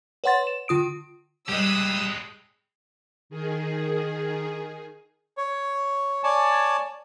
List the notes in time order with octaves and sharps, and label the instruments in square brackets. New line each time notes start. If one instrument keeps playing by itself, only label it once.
[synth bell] B4 C#5 F#5 C6 A6
E7
D3 F4 D#6 D7
[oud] G3 D#5 [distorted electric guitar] G#3 G4 [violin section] D#6 E6 F#6
[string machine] D#3 G#4
[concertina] C#5
C#5 D5 G#5 A5